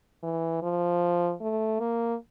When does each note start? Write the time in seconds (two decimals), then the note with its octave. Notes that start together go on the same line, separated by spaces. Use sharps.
0.23 E3
0.62 F3
1.41 A3
1.79 A#3